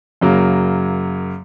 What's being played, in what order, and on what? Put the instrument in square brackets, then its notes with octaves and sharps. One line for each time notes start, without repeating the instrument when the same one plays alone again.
[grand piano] F#2 C#3 F#3 A#3